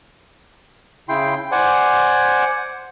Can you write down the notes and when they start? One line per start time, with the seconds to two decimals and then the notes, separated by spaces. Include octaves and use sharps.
1.09 C#3 E4 G5 C6
1.52 C5 D5 F#5 G#5